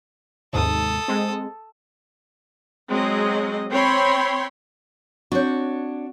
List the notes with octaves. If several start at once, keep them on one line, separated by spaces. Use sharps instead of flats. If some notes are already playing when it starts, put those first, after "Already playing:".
D#2 G#2 C3 A4 D#6
G#3 C4
F#3 G#3 C4 D#5
C4 C#5 G5 B5 C6
C4 D4 F#4 C#5 G6